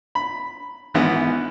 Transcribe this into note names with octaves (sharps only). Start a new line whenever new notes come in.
B5
G#1 E3 B3